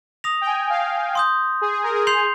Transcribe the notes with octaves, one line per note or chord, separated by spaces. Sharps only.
D#6 A#6 F7
G5
G#5
F5
C6 D#6 G6
G#4
G#4
A#4
G#4
C6 G6 C7 F7